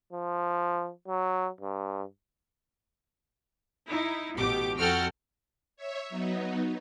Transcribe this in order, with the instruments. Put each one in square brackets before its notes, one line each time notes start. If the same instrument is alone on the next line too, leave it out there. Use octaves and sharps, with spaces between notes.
[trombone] F3
F#3
G2
[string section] D#4 E4
A1 B2 G4 D6
F2 F#4 A4 F#5 G5 F6
[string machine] C#5 E5
F#3 B3 D#4